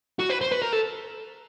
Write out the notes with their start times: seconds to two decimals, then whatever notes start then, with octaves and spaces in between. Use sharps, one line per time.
0.20 F#4
0.30 B4
0.41 C5
0.52 B4
0.62 A#4
0.73 A4